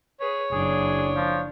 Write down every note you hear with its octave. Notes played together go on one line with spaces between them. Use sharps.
G#4 B4 C#5
F#1 F#2 D4 G#4
F3